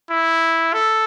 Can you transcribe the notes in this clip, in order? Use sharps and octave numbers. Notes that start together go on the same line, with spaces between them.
E4
A4